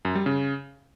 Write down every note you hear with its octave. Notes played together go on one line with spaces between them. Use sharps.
F#2
G3
C#3